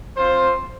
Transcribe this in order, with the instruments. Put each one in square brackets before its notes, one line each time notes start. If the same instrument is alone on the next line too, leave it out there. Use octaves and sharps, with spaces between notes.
[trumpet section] C4 F4 C5